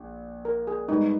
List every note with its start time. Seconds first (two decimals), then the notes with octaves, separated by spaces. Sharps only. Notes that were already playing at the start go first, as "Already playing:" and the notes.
Already playing: A#1
0.45 A#4
0.67 G#4
0.88 G#2 G3 B3 D#4